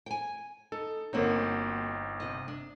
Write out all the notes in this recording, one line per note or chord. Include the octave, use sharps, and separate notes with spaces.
G5 G#5
D#4 A4
G1 A#3 C4 D#4 F#4 C#5
C3 D#5
D4